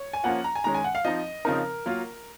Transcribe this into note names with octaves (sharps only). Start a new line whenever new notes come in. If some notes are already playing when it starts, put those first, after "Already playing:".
Already playing: C#5
G#5
F3 A#3 C#4 F4 F#5
A#5
G#5
D#3 G#3 C#4 A#5
G#5
F#5
F5
F3 C4 D#4 D#5
C#3 F3 C4 D#4 A#4
F#3 A#3 F4